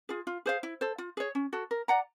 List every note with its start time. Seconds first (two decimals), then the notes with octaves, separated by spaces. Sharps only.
0.09 F4 G#4
0.27 F4
0.46 G#4 C5 F5
0.63 E4
0.81 A4 C5
0.98 F4
1.17 G#4 C#5
1.35 C#4
1.53 F#4 A4
1.71 A#4
1.88 D5 F#5 A#5